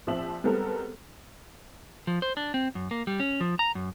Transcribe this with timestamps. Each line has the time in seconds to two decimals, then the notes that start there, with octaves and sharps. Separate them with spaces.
0.07 A#1 F3 C4 E5 E6 F#7
0.44 G3 G#3 B3 C4 A4 A#4
2.07 F3
2.22 C5
2.37 D4
2.54 C4
2.75 F#2
2.91 A#3
3.07 G3
3.20 C#4
3.41 F3
3.59 A#5
3.75 F#2